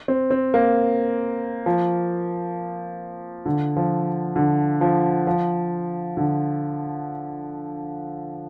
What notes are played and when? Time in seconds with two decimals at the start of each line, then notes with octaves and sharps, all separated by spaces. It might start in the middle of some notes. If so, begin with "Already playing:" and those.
0.08 C4
0.31 C4
0.54 A#3
1.66 F3
3.46 D3
3.77 F3
4.36 D3
4.81 F3
5.27 F3
6.17 D3